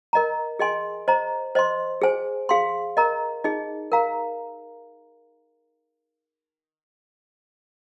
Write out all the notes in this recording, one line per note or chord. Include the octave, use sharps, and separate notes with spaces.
A#4 D#5 A#5
G#4 D#5 G#5 C6
C5 D#5 A#5
C5 D#5 C6
G#4 C5 G#5
G#4 F5 C6
A#4 D#5 A#5
D#4 G#4 D#5
A#4 F5 A#5